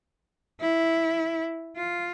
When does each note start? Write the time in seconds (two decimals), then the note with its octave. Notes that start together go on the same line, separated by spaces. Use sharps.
0.61 E4
1.76 F4